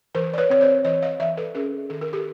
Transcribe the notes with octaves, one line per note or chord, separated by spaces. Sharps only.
E3 A#4 C5
D5
B4 C#5
C4 C#5
C5 D5
E3 C#5 D#5
D#5 F5
E3 D5 E5
A4 B4
C#4 G#4 A#4
D#3 A4
A#4
G4 A4